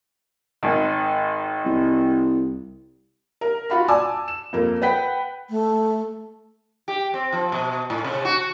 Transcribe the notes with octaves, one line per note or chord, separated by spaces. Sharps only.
G#1 D#3
C2
A#4
F4 F#4 F5 B5
D5 G#5 A5 D6 E6
E7
F2 A#3
B4 F#5 G5 B6
A3
G4
C4
F3
B2
A2
C3
F#4